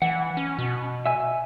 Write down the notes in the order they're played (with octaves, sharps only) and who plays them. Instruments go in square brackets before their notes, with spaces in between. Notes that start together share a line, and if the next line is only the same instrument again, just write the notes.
[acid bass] E3 [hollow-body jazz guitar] F#5
[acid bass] C#4
B2
[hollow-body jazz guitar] E5 G#5